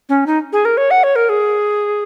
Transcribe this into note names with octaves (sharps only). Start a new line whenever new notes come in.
C#4
D#4
G#4
A#4
C#5
F#5
C#5
A#4
G#4